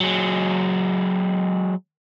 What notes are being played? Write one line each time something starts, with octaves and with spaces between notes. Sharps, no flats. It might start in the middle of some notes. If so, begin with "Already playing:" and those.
F#3 G#3